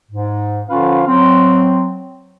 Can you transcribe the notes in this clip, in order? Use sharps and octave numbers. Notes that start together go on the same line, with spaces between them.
G#2
D3 F3 C#4 F4 B4 F5
F#3 C4